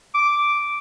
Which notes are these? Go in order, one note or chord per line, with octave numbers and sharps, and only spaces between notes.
D6